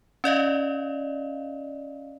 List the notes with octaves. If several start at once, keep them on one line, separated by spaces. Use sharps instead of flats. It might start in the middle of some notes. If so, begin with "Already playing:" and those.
C#4 D5 D#5 F5